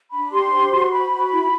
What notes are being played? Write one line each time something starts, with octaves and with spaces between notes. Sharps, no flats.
D4 B5
G4 C6
C5
F#4
C5 B5
F#4
E4